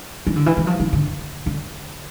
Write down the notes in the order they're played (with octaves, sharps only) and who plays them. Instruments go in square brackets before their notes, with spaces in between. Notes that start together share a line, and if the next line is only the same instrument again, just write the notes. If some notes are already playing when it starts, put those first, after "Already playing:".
[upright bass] E3
D3
E3
E3
F3
E3
D3
D3